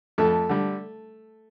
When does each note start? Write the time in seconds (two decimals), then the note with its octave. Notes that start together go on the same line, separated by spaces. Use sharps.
0.18 F2 A3 A4
0.49 D3 G3